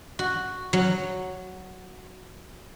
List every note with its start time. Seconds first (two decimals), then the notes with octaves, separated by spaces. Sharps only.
0.19 F#4
0.73 F#3